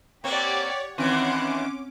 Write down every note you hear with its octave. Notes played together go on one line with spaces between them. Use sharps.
A#3 C4 G4 C#5 D5 F#5
D#3 E3 C4 C#4 F#5 C6 D6